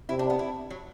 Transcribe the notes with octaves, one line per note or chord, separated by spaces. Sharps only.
C3 E4
D4
B3
E4
F#3